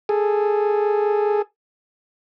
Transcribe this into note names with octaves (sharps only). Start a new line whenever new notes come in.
G#4 A4